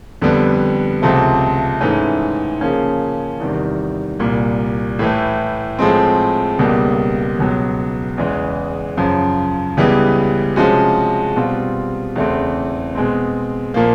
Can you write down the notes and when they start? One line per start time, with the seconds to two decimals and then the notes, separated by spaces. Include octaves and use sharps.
0.22 F2 D3 G3 B3
1.02 C#2 C3 F3 A3
1.81 G#2 E3 A3 C#4
2.61 C#3 F3 A#3 C#4
3.40 E2 C3 D#3 G3
4.19 C2 A#2 G3
4.99 A2 E3 A3
5.79 A2 F3 G#3 C4
6.59 C#2 B2 G3 A#3
7.38 C#2 B2 F#3
8.18 E2 C#3 E3 G#3
8.97 F#2 C#3 F3
9.77 C#2 C#3 E3 G3 B3
10.56 C3 F3 G#3 C#4 F#4
11.36 B2 G3 C4 F4
12.16 E2 C#3 E3 A3 C4
12.95 B2 G#3 C4
13.74 A#2 F3 A#3